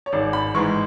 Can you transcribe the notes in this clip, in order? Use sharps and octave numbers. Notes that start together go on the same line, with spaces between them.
C#5
G#1 D5
B5
G#2 E3 G#3 C#6